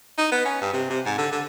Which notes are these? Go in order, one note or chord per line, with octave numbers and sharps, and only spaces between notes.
D#4
B3
C#4
G2
C3
C3
G#2
D3
D3